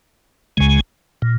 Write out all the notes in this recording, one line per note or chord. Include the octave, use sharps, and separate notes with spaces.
C#2 C#3 G#3
A#2